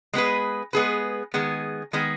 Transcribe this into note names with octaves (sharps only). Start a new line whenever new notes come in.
G#3 B3 G#4 B4
G#3 B3 G#4 B4
D#3 G#3 B3 G#4
D#3 G#3 B3 G#4